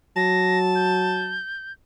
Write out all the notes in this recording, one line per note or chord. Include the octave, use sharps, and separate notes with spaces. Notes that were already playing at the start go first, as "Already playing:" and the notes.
F#3 A5 A#6
G6